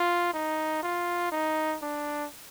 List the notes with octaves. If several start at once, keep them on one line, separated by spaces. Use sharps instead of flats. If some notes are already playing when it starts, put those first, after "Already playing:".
Already playing: F4
D#4
F4
D#4
D4